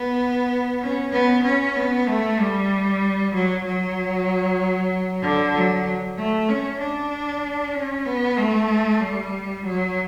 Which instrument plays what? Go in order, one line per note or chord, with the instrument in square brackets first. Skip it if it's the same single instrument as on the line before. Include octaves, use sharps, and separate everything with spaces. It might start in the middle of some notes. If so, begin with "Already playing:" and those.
Already playing: [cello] B3
C#4
B3
C#4
B3
A3
G3
F#3
F#3
D3
F#3
A3
C#4
D4
C#4
B3
A3
G3
F#3